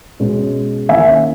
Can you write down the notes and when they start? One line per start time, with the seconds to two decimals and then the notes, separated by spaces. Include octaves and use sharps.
0.20 B2 G#3 C#4
0.89 D#3 A#3 C#4 E4 E5 G#5